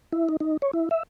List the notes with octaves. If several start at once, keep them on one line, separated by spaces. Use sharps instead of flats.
E4
D#4
D#4
C#5
E4
E5